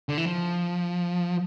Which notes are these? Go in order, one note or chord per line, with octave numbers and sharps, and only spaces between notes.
D3
E3
F3